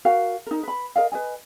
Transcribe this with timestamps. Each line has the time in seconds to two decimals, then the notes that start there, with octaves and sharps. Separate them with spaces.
0.05 F#4 A#4 F5 G5
0.46 D#4 A#4
0.63 B4 B5
0.96 A#4 D#5 F5
1.12 B4 C#5 D#5 G#5